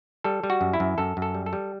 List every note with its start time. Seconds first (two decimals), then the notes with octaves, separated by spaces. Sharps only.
0.24 G3 A4
0.44 G3
0.50 F#4
0.61 F#2
0.73 E4
0.80 F#2
0.98 F#2 A4
1.17 F#2
1.22 A4
1.34 G3
1.46 A4
1.53 G3